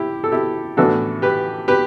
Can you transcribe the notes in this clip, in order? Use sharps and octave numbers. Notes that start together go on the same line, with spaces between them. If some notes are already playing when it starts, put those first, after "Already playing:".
Already playing: E4 G4
A4
E4 G4
A2 E3 B3 D4 F#4 A4
G4 B4
G4 B4